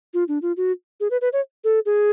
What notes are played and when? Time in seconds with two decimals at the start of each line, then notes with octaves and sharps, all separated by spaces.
0.14 F4
0.28 D4
0.42 F4
0.57 F#4
1.00 G#4
1.11 B4
1.21 B4
1.33 C#5
1.64 A4
1.86 G#4